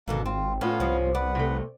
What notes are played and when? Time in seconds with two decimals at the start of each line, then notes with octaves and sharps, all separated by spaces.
0.08 G#1 G#2 B2 D3 A#3
0.26 C4 F4
0.61 A2 B3 C#4 F4 F5
0.80 C2 G#2 F3
1.15 B3 B4 D5 F#5
1.35 C3 A3